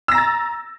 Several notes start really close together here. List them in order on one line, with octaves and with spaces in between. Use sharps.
E6 A#6 A#5 A6